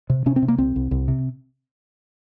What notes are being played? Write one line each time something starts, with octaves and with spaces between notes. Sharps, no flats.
C3
C3 C#4
C4
C3
A#3
C2 C4
C2
C2
C3